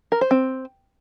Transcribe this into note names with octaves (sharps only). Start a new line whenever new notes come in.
A#4
C5
C4